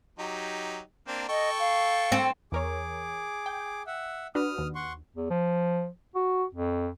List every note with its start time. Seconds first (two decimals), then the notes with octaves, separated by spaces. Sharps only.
0.19 F#3 D#4 G4
1.07 A#3 C4 D4
1.29 A4 D#5 G5 C#6
1.59 F5
2.12 C4
2.52 E2 G#4 A#4 C#5 D6
3.46 G5
3.87 E5 F#5
4.35 D4 F#4 B4 D#6 F6
4.58 D#2
4.75 F#5 C6 C#6
5.16 E2
5.30 F3
6.15 F#4
6.55 F2